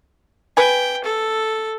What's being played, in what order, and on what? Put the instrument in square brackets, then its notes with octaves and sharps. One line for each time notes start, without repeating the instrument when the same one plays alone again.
[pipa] B4 G#5 [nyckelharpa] G5
[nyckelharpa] A4